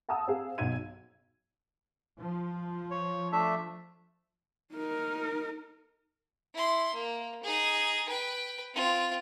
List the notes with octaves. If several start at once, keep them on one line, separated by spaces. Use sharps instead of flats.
F#5 A5 A#5 D#6 E6
C4 G#4 F5
B1 B2 D#4 F#4 G#6 D#7
F3
C#5
A3 D4 E5
D#4 A#4
E4 C6
A#3
D#4 G#4
B4 G5
C4 F4